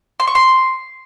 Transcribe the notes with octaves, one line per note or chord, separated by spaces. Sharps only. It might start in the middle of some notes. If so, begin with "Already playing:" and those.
C6
C#6
C6